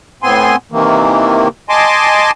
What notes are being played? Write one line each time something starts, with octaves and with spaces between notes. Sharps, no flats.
A2 B3 C4 G#5 C6
C3 D#3 E3 A#3
D#5 G#5 A5 C6 D6